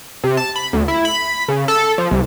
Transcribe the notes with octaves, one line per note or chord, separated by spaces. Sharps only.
C3
A5
B5
D2
E4
B5
C#3
A4
F3
C2